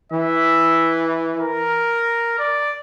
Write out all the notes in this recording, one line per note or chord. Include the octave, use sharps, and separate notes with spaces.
E3 E5
A#4
D5